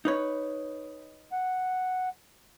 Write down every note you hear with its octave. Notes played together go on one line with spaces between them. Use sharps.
D#4 B4 C#5
F#5